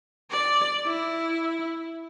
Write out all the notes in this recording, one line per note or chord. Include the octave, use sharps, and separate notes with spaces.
D5
E4